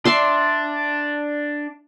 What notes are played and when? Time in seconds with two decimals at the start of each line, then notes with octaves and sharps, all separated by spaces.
0.05 D4 D5 E5 C6